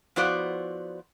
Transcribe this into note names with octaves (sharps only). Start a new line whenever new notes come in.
F3 B3 E4 F#4 C5 D5